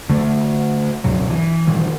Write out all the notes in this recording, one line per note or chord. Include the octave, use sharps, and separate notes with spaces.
D3 A3
C#2 G2 B2 F#3
E3
G2 A#2 D#3 E3